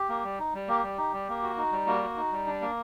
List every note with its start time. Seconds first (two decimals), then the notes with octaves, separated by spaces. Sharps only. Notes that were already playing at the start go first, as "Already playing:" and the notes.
Already playing: G4
0.09 A#3
0.24 G3
0.39 D#4
0.54 G3
0.68 A#3 G4
0.83 G3
0.98 D#4
1.13 G3
1.29 A#3
1.43 F#4
1.57 D#4
1.72 G3
1.87 A#3 F#4
2.02 F#4
2.17 D#4
2.32 G3
2.47 D4
2.61 A#3